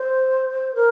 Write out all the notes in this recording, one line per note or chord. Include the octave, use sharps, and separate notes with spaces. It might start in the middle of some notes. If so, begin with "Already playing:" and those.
Already playing: C5
A#4